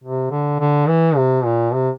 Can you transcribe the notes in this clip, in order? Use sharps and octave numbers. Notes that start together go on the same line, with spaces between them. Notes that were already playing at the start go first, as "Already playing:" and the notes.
C3
D3
D3
E3
C3
A#2
C3